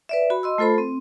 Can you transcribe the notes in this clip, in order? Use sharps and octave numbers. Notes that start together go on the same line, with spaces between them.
B4 D5 E5
F#4 B5
D#5 C6 E6
A3 F4 A4 C5 B5
C4